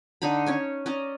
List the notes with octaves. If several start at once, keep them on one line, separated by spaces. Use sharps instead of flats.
D3 D#4 A#5 B5
C#4 C#5 G#5
C#4 D5 D#5 A#5